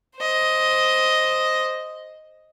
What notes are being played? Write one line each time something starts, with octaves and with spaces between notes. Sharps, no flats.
C5 D#5